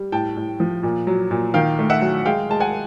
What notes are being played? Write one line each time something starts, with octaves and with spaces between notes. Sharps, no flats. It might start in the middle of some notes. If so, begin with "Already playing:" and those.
Already playing: G3
A2 G5 A5
A2
F3
A#2
F#3
A#2
D#3 F5 G5
A3
E5 F#5
F#3
G#3 F5 G5
G#3 A5
F#5 G#5